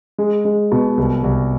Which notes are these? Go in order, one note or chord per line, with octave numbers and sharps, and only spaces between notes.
G#3
G#3
B2
C2
C2